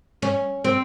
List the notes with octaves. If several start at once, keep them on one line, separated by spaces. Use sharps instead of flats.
C#4
C4